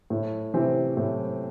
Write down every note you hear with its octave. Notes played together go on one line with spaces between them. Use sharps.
A2
C3 E3 C4
A2